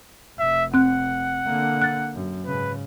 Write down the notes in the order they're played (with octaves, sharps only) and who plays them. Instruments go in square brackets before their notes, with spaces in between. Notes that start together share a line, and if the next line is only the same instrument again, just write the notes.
[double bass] F1 [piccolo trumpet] E5
[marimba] C4 F#6 [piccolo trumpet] F#5
[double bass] D3 A#3
[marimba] F#6 A6
[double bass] F#2
[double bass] G#2 C#3 [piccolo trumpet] B4